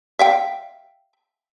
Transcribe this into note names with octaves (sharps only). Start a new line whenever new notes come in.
E5 F5 G5